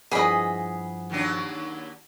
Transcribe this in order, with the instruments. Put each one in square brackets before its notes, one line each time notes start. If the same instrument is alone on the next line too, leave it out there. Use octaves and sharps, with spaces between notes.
[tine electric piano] G2 F3 F#5 [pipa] E3 D#5 [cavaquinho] G#4 B5
[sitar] D#2 F#3 D4